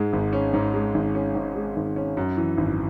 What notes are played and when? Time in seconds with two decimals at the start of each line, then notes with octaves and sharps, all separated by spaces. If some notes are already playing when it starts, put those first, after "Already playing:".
Already playing: G#2 G#3
0.13 G#1
0.33 C#4
0.54 G#2
0.74 G#3
0.94 G#1
1.15 C#4
1.35 G#2
1.55 G#3
1.76 G#1
1.96 C#4
2.17 F#2
2.37 E3
2.57 G#1